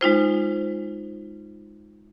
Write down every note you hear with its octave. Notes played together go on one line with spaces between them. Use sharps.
G#3 D#4 F4 C5